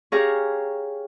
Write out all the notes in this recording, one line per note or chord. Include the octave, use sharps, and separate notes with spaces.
C#4 G4 G#4 F5 A#5 C#6